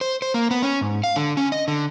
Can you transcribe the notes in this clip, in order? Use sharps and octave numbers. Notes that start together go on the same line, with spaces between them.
C5
C5
A#3
B3
C#4
G#2
F5
D3
C#4
D#5
D3